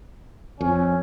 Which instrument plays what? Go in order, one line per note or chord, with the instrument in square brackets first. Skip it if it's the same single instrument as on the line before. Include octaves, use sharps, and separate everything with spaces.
[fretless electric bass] F2 [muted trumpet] C#4